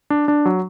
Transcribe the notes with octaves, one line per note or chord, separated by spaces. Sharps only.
D4
D4
F#3